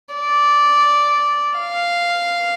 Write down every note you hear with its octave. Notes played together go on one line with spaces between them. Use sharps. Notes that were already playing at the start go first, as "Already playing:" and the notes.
D5
F5